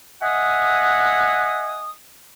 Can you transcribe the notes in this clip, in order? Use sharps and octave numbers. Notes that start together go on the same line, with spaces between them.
D#5 E5 F#5 G#5 D#6